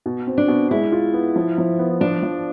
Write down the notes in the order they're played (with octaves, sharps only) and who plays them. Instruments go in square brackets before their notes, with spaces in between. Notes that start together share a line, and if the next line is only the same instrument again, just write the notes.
[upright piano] B2
C4
[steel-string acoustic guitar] D4
[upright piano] B2
[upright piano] G#3 [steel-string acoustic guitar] E4
[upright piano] F4
B3
F3
F3
B3
[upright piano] F3 [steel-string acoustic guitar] D4
[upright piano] F3